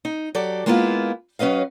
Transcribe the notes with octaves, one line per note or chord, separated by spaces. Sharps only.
D#4
F#3 G4 A4 D5
G#3 A#3 B3 D4 E4 F4
F#3 C#4 B4 D#5 F5